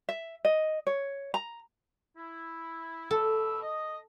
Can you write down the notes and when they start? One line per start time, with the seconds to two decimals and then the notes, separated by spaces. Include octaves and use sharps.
0.09 E5
0.45 D#5
0.87 C#5
1.34 A#5
2.17 E4
3.11 B2 A4 B5 E6
3.63 D#5